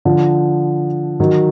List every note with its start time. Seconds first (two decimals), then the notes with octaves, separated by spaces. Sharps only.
0.05 D3 F3
1.20 D#3 F#3